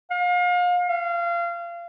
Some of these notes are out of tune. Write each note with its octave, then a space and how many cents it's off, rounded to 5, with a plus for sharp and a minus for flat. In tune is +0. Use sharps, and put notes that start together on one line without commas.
F5 +35
F5 -25